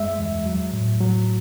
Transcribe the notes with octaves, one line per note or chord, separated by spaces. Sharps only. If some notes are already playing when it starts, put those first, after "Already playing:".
Already playing: F#2 G#3 E5
E2
F#3
A2
F#3